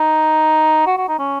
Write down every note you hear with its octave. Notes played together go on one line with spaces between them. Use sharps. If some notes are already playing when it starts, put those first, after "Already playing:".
Already playing: D#4
F#4
F#4
D#4
C#4